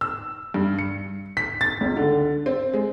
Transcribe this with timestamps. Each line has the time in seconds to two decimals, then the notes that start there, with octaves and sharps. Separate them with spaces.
0.01 E6
0.54 G2
0.79 C#7
1.37 B6
1.61 A6
1.81 C#2
1.97 D3
2.46 C4
2.74 G#3